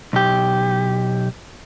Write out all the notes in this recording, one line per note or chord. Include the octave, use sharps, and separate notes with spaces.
B1 G4